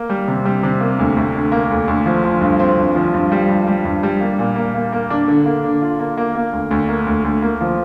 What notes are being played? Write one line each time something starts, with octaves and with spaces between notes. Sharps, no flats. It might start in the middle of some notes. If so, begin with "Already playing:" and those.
Already playing: A#3
G3
C3
G3
C3
A#3
D2
D2
D3
A#3
D2
D2
F3
F3
G2
C4
G2
F3
G2
G3
G2
G3
G2
G3
A#3
A#2
A#3
A#3
A#3
D4
D3
A#3
D3
F4
A#3
A#3
A#3
D2
D2
A#3
D2
D2
A#3
F3